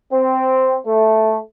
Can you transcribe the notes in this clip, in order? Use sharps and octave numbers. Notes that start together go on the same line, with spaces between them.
C4
A3